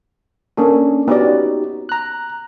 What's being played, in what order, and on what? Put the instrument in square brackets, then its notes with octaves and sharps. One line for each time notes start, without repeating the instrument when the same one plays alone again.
[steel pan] A#3 A4 C#5 [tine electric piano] C#4 D4
[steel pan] B3 C#4 D5 [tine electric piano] D#4 F#4 G4
[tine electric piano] A#5 F#6